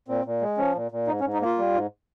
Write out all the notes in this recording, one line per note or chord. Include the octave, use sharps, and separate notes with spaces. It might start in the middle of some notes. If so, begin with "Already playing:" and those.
A#2 C4
A#2
G#3
F3 C#4
A#2
A#2
G#2 D#4
C#4
G#2
D#4
A#3 F4
G3
G#2